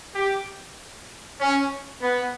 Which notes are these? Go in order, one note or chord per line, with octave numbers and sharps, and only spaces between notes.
G4
C#4
B3